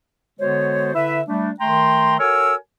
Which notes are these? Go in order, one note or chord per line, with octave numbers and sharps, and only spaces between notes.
D3 G#3 B3 F#4 C5 C#5
D3 E4 B4 E5
G3 A3 D4
D#3 A3 G5 A#5 C6
F#4 A4 A#4 C#5 G#5 E6